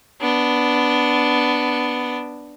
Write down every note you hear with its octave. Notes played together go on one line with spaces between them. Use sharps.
B3 D4